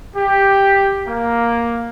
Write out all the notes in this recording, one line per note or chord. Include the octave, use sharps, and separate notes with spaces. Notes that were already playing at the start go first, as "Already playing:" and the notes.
G4
A#3